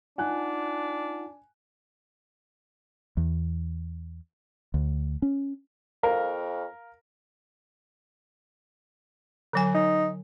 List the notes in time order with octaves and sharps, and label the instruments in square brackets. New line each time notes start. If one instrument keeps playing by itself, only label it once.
[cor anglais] D4 [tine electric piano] D#4 F4 F#5 [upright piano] G#5 F#6
[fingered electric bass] E2
D2
C#4
[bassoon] F2 [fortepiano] A#4 [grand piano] F5
[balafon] D3 F#3 G#5
[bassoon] D#4